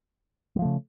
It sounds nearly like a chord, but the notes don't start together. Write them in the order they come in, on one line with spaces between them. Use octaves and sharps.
G3 F3 A3 C#3